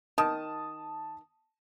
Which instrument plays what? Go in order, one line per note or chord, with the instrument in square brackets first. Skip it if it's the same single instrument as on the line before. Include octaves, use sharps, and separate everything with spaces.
[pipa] D#3 [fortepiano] A5 D#6